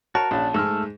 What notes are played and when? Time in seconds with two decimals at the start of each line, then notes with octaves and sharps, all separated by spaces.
0.15 F#4 A#4 C#5 A5
0.31 A#1 C#4 D4
0.54 G#2 G#3 A3 E6 F6